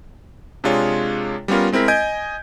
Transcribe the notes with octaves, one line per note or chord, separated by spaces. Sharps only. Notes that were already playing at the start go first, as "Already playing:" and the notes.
C3 G#3 D4 F4 G#4 C#5
G3 B3 C#4 F4 A#4
G#3 C4 E4 A#4 B6
D#5 G#5 G6 G#6 D7